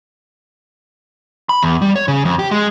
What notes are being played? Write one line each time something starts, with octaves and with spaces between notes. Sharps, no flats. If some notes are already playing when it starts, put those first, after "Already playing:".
B5
E2
G3
C#5
C#3
F2
G4
G#3